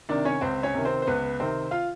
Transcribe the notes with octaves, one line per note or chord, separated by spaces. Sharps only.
C3 D#3 D4 D5
C#4 C#5
C#2 C4 C5
C#4 C#5
C3 D#3
C4 C5
C5
C#2 B3 B4
C3 D#3 C4 C5
F4 F5